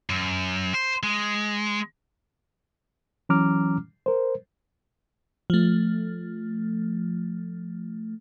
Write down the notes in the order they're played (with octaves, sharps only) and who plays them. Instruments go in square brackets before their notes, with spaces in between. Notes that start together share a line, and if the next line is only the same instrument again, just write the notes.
[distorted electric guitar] F#2
C5
G#3
[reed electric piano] E3 F#3 C#4 A#5 D6 F6
A#4 C5
[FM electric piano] F3 A3